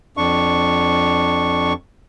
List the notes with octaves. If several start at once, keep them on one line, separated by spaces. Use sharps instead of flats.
F2 D4 C#6